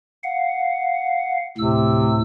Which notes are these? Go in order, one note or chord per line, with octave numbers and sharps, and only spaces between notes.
F5 F#5
D2 A2 C3 E6